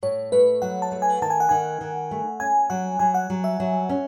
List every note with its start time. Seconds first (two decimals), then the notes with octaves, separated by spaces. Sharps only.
0.03 A2 C#5
0.32 A3 B4
0.62 F#3 F#5
0.82 A5
0.92 A3
1.02 G#5
1.22 D#3 A5
1.30 G#5
1.40 F#5
1.49 D#3 G#5
1.81 D#3
2.11 A3
2.40 C#4 G#5
2.70 F#3 F#5
2.99 F#3 G#5
3.14 F#5
3.30 F#3
3.44 E5
3.60 F#3
3.89 C#4